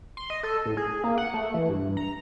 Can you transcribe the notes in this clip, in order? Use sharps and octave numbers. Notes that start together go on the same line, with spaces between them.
C6
D#5
A4
A2
G#4
A#3
F#5
A3
E3
G2
A#5